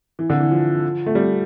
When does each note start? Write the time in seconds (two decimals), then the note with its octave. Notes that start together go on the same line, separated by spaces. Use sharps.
0.19 E3
0.30 D3
0.40 E3
0.51 F3
1.06 A3
1.15 G3